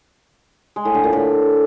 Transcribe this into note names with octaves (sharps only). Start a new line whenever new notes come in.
G#3
A2
D3
A#2
A2